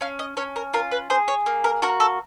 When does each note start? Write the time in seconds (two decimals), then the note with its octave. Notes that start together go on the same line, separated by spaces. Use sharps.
0.01 C#4 F5
0.19 D#5
0.37 C#4 C#5
0.56 A#4
0.73 F4 A#4
0.91 B4
1.10 G#4 C5
1.28 C#5
1.46 A#3
1.64 A#4
1.82 F#4 A#4
2.00 A4